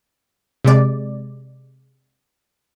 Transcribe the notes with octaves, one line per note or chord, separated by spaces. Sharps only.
C3 G#3 D5